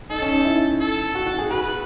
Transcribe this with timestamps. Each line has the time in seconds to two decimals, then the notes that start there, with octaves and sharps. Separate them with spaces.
0.10 D#4 A4
0.22 C#4
0.33 D#4
0.45 E4
0.81 A4
1.15 F#4
1.26 F#4
1.38 G#4
1.50 F#4 B4